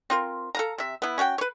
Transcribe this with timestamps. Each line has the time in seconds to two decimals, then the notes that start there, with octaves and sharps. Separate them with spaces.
0.10 C4 F4 A#4
0.55 A4 F5 A#5
0.78 C3 E5
1.02 B3 E4
1.18 C#4 F#4 F#5 G5
1.38 B4 C#5